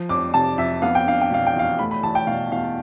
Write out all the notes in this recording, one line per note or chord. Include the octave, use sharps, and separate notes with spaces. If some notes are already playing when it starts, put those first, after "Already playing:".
Already playing: F3
F2 D6
C3 A5
F2 E5
B3 F5
G5
D4 F5
G5
B2 F5
G5
E2 F5
A3 B5
B5
E2 A5
G5
B2 F5
E2 F5